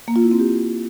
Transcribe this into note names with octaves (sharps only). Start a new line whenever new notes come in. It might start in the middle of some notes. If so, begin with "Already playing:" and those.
A#3
F4
E4
C4
G4